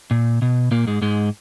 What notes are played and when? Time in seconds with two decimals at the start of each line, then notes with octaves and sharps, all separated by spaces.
0.11 A#2
0.42 B2
0.71 A#2 A#3
0.87 G#2 G#3
1.02 G#2 G#3